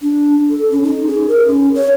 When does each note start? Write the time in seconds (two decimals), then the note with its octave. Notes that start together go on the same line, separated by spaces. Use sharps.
0.01 D4
0.50 A4
0.71 C#4
0.83 D#4
1.07 G#4
1.28 A#4
1.47 C#4
1.75 C#5